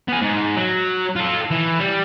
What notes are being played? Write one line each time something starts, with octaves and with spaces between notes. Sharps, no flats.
B3 G#5
G#2
F#3
F4 A4
E3
G3